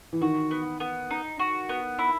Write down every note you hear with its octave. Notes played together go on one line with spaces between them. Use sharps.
E3
D#3 F#4
B3
B3
D#4
F#4
B3
E4